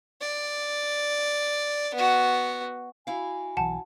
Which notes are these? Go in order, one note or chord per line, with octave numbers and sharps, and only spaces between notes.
D5
B3 F#4
E4 F#4 F5 G#5
B1 E3 F#5 A5